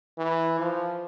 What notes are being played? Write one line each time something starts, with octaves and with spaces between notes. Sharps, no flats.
E3
F3